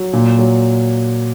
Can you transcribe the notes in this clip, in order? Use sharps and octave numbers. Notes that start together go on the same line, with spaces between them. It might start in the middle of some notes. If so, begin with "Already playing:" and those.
Already playing: F#3
A#2
F#3